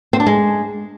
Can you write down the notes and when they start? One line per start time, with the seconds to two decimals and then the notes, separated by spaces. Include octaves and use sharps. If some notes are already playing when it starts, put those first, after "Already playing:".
0.13 C4
0.20 D4
0.26 G#3